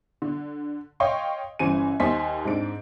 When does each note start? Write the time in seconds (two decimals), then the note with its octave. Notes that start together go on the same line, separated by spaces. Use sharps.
0.22 D3
1.00 C#5 D#5 F5 G5 C6 C#6
1.59 G1 C#3 E3 C5 G#5 D#7
2.00 D#2 C5 D#5 G#5 C6 B6
2.45 G#2 C4 D4 D7